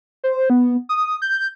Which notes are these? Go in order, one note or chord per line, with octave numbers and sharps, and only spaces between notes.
C5
B3
D#6
G6